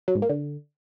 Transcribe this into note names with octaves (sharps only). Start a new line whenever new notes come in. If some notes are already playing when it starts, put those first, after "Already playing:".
F#3
G#2
A#3
D3